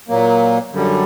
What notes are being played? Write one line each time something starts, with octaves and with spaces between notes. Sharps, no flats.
A#2 F#3 A#3
F#2 D3 G3